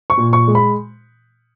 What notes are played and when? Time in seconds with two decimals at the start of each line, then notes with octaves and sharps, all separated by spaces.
0.10 C#6
0.18 A#2
0.33 C#6
0.48 G#3
0.55 B5